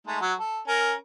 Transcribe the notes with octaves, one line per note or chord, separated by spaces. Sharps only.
G#3 A3 D#4
F#3 F#4
A4
C#4 A#4